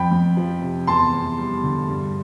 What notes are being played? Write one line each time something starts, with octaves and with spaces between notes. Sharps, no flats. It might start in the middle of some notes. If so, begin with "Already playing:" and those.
Already playing: F2 G5 B5
F2
F3
C3
E2 A5 C6
E2
G3
D3
G2